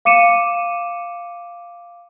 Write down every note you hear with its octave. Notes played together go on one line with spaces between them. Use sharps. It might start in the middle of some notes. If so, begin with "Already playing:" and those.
F5 D6 C#7 D#7 E7